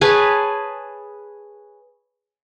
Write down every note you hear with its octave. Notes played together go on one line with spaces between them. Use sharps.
G#4 B4 C#5 A5